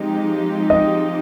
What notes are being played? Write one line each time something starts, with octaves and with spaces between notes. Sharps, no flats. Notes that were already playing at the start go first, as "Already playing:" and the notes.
Already playing: F3 G#3 C4 D#4 G4
D#5